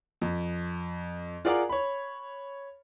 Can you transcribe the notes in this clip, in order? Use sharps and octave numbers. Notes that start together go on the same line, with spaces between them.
F2
F4 G#4 A#4 D5 F#5 D6
C#5 B5